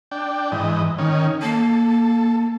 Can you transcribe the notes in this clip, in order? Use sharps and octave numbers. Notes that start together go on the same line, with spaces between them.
D4 G5
G#2 E3 D#5
D#3 C#4
A#3 A4